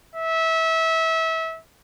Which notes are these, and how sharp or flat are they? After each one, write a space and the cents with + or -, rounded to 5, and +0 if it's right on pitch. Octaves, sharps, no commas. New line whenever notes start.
E5 -25